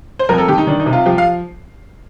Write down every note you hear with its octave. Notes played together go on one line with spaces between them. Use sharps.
C5
F2 A#4
A4
D#3 G4
D#4
D#3 D4
D#4
C3
F4
F3 G4
F5